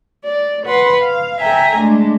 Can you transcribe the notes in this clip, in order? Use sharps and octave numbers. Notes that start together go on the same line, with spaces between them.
D5
B4 F#5 C6
F5
A4 E5 G5 G#5 A#5
G#3 A3 D4